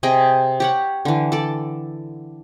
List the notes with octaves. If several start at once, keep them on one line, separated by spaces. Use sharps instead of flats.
C3 G#4 D#5 G5
G4 C#5 F#5
D3 E3
A4 D5